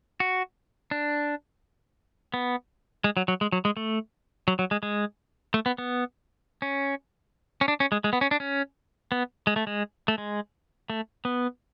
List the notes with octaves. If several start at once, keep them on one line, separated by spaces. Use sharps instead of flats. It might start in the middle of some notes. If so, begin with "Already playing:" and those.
F#4
D4
B3
G#3
F#3
F#3
G#3
F#3
G#3
A3
F#3
F#3
G#3
G#3
A3
B3
B3
C#4
C#4
D4
C#4
G#3
G#3
B3
C#4
D4
C#4
B3
G#3
A3
G#3
A3
G#3
A3
B3